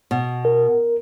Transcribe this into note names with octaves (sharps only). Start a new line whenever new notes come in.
B2
A#4